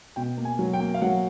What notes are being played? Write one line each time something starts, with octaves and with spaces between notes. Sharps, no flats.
B2 G5
A#3
G#5
F#3
G5
A#3
F5
F#3 F#5